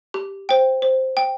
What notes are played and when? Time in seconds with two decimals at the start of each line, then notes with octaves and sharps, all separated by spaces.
0.14 G4
0.49 C5 G5
0.82 C5
1.17 G5